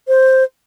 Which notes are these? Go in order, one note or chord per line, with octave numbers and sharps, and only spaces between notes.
C5